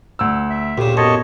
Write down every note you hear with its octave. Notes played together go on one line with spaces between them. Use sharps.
D2 E6
E5
D2 A#2 C#3 G4
B1 F#2 C#5 D#5 A5